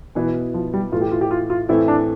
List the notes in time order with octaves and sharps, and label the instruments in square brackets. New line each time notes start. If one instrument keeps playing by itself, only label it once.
[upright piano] B2 B3 E4 [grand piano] E3
[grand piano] F3
G3
[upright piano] A2 E3 A3 [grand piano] F4
[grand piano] G4
F4
G4
F4
F4
[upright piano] A2 E3 A3 C4 [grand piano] E4
[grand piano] D4